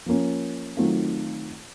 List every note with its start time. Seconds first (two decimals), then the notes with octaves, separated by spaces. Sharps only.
0.06 F3 A#3 C#4
0.77 D#3 F#3 A3 C4 F4